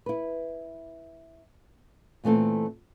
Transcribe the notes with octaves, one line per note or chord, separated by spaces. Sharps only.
E4 B4
A#2 E3 A3 C4 A4